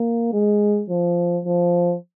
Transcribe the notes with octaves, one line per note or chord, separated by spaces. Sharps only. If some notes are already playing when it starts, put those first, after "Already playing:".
Already playing: A#3
G#3
F3
F3